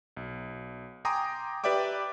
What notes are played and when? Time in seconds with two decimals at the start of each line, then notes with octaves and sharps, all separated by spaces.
0.17 B1
1.05 G5 G#5 A#5 C6 D6 D#6
1.64 G4 B4 D5 E5 G5 D6